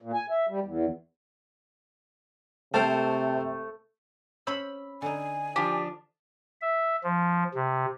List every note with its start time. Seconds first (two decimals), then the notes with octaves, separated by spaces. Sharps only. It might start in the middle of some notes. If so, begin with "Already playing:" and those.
0.02 A#2
0.14 G#5
0.30 E5
0.49 G3
0.64 E2
2.74 C3 A3 A4 A#4 C5 G5 A5
4.47 C#4 C5 B5 E6
5.02 D3 D#4 G#5
5.56 F3 D4 G4
6.61 E5
7.04 F3
7.55 C3